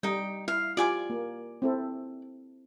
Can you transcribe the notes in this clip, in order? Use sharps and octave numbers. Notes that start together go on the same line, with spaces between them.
G3 D#4 G5
E4 F5
F4 G4 D5 G#5 D6
A#3
C4 E4 A4